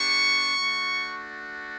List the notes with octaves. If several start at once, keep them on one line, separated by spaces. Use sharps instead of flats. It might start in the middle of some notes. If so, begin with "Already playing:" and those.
Already playing: B3 D4 G4 C#6
A3 D4 F#4